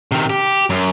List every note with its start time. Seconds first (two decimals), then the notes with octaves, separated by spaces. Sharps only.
0.12 C3 D#3
0.30 G4
0.70 F#2